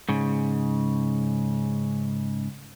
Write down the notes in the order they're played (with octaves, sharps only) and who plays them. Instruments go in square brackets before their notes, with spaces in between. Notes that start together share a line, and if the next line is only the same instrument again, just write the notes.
[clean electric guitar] G#2 C#3